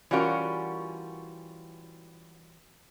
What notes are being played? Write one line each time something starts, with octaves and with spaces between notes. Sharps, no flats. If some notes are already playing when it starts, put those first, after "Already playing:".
E3 G3 C#4 F4 F#4 A#4